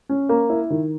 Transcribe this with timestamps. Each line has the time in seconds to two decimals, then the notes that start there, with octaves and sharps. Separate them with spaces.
0.09 C#4
0.29 A#3
0.50 E4
0.70 D#3